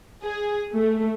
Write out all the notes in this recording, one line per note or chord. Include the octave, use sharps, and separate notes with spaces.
G#4
A3